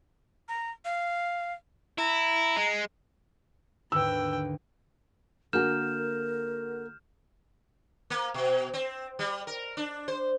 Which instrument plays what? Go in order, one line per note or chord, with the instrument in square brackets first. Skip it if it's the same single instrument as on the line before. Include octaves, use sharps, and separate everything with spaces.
[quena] A#5
F5
[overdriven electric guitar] E4 [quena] A#5
[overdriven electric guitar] G#3
[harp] D#2 G#2 D3 [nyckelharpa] B4 G5 [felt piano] E6
[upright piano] D3 F#4 [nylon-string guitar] A#3 G#5 [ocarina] A#4 [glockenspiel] F6 G6 E7
[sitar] A#3
B2
C4
G3
A#4
D4
C5